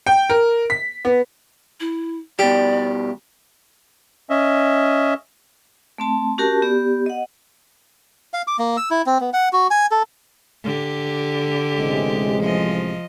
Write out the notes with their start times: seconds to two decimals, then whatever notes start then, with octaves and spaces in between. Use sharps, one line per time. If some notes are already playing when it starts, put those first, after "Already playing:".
0.06 G5
0.30 A#4
0.70 B6
1.05 B3
1.80 E4
2.39 B2 G3 G4 D5
4.30 C#4 D#5 E5
5.98 A3 C4 A5
6.38 C#4 F#4 G4 A#4 A5
6.62 B3 G4 D5
7.06 D#5 F#5
8.34 F5
8.47 D6
8.59 A#3
8.77 E6
8.90 E4
9.06 C4
9.20 B3
9.33 F#5
9.53 F#4
9.71 G#5
9.91 A4
10.64 D3 G4
11.79 A1 C3 G#3
12.42 F3 D#5